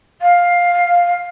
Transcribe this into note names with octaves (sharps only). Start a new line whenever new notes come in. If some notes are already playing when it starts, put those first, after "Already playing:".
F5